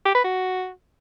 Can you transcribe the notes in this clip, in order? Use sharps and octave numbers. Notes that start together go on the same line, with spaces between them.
G4
B4
F#4